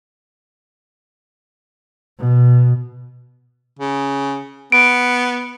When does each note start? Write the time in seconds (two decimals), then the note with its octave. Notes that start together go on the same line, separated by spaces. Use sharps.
2.19 B2
3.79 C#3
4.72 B3 D7